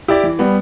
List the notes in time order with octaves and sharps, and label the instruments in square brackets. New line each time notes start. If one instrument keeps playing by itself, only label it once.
[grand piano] E4 G4 D5
E3
G3 B3